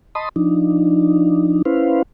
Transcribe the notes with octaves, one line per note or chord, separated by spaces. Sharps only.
D#5 A5 B5 C6 D#6
F3 D4 D#4
C#4 E4 B4 C5 F5